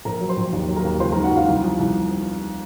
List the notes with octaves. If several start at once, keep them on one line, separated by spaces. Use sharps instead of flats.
A#1 A#4 A#5
F#3
C5 C6
A#1
D#2
F#3
A#4 A#5
D#2
C#2 C5 C6
A#4 A#5
D#3
F#4 F#5
C#2 F4 F5
C2
F3
C2